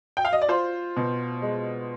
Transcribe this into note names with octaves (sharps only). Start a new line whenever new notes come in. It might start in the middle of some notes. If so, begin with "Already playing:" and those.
G5
F5
D#5
D5
F4 C5
B2
G#3